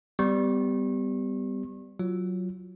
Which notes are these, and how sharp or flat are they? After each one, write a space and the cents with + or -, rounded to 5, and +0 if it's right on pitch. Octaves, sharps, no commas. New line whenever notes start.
G3 +0 B3 +35 C#6 -35
F#3 +0 F4 +0